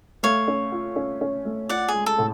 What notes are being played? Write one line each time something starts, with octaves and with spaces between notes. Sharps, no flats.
A3 C#5 F5
C#4
F4
C#4
C#4
A3
F4 D5 F#5
G#4
G#3
A4
A2